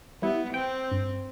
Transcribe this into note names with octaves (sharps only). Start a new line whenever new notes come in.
G3 B3 E4
C4 G5
G2